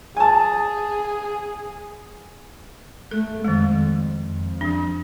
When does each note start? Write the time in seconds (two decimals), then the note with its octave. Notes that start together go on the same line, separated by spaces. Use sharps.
0.17 G#4 G#5 A5
3.11 A3 A4
3.45 F2 D#3 G#3
4.24 F2
4.61 F3 D4